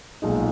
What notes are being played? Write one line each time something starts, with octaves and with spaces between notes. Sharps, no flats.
B1 A#2 G#3 D#4